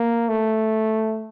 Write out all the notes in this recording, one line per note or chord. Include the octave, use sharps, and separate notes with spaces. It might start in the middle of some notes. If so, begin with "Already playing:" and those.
Already playing: A#3
A3